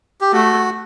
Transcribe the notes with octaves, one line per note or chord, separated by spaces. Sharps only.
G4
A3 F#4